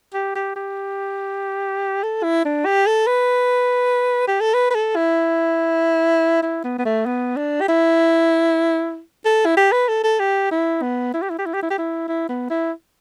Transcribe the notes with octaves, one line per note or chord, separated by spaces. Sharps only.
G4
G4
G4
A4
E4
D4
G4
A4
B4
G4
A4
B4
B4
A4
E4
E4
B3
B3
A3
B3
D4
G4
E4
A4
E4
G4
B4
A4
A4
G4
E4
B3
E4
G4
E4
G4
E4
G4
E4
G4
E4
E4
B3
E4